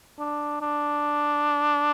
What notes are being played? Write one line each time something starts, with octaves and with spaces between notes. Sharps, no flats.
D4
D4